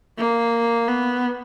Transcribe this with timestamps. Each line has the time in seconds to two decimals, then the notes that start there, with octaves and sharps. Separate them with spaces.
0.19 A#3
0.88 B3